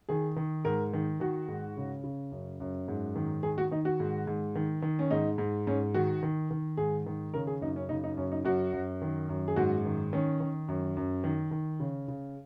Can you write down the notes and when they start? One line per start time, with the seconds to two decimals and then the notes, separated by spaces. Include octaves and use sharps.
0.09 D#3 G#4
0.36 D#3
0.65 G#2 A#4
0.93 D#3
1.20 D#3 F#4
1.48 G#2
1.77 C#3
2.04 C#3
2.32 F#2
2.60 F#2
2.88 G#2
3.16 D#3
3.43 D#3 G#4
3.58 F#4
3.71 D#3 D#4
3.85 F#4
4.00 G#2
4.27 G#2
4.55 D#3
4.82 D#3
4.99 C#4
5.11 G#2 D#4
5.38 G#2
5.67 G#2 C#4
5.94 D#3 F#4
6.23 D#3
6.51 D#3
6.77 G#2 G#4
7.06 D#3
7.34 C#3 A#4
7.47 G#4
7.61 F#2 D#4
7.76 C#4
7.89 C#3 D#4
8.04 D#4
8.17 F#2 C#4
8.31 D#4
8.45 F#2 F#4
8.73 F#2
9.02 D#3
9.29 F#2
9.48 G#4
9.56 G#2 F#4
9.85 D#3
10.13 D#3 C#4
10.40 D#3
10.68 F#2
10.97 F#2
11.24 D#3
11.51 D#3
11.80 C#3
12.08 C#3